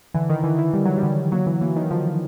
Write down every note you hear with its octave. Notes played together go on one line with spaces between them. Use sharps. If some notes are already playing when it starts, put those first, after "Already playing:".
D3 E3
D#3
D3 E3
E3
D3 G3
F#3
G3
D3
F#3 A#3
E3
E3 A#3
D#3
D3 F3